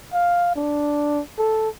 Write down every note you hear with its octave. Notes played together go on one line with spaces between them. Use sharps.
F5
D4
A4